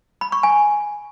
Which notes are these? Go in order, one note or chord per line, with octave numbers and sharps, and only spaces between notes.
B5
C#6
G#5